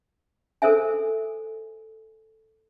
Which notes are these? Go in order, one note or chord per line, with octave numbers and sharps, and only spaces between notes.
A4 A#4 C5 E5 G#5